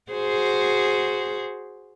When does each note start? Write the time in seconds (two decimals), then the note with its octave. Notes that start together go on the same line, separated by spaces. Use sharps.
0.12 F#4 G#4 C5